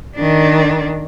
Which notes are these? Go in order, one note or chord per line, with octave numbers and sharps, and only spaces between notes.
D#3 D4